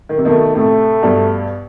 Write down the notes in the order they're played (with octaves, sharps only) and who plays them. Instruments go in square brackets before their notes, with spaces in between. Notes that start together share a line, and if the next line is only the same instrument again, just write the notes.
[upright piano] D#3
C3
[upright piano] B2 D#3 [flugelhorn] A3
[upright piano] A2 C3 [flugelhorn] A3
[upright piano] G2 B2